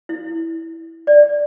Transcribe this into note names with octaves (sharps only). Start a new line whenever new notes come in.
E4
D5